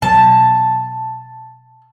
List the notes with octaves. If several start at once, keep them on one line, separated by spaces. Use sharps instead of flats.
B2 F#3 A5